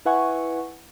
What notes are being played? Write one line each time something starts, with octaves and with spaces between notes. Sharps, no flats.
E4 B4 E5 F#5 G#5 C#6